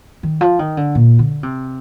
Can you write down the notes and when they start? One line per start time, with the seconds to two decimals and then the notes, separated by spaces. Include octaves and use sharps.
0.23 D#3
0.41 F3
0.59 D#3
0.77 D3
0.95 A#2
1.19 D3
1.43 C3